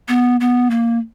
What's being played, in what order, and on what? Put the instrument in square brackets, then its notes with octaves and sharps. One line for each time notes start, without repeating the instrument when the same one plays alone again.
[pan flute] B3
B3
A#3